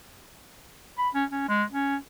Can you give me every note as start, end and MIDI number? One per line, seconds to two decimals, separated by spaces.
0.98 1.09 83
1.15 1.25 61
1.31 1.44 61
1.49 1.63 56
1.72 1.96 61